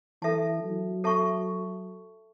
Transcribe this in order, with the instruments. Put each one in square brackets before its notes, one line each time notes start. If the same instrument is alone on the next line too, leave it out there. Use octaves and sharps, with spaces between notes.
[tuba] E3 [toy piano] A4 E5 A5
[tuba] F#3
[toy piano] A4 E5 A5 C#6